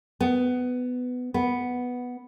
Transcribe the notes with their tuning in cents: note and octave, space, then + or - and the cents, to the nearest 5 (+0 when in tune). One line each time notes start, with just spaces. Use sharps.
B3 +15
B3 +0